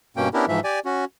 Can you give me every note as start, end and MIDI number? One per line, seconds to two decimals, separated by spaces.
0.17 0.29 43
0.17 0.29 47
0.17 0.29 58
0.17 0.29 61
0.17 0.29 79
0.34 0.45 59
0.34 0.45 61
0.34 0.45 62
0.34 0.45 64
0.34 0.45 67
0.34 0.45 70
0.48 0.60 44
0.48 0.60 52
0.48 0.60 53
0.48 0.60 76
0.64 0.79 67
0.64 0.79 74
0.64 0.79 80
0.85 1.05 61
0.85 1.05 66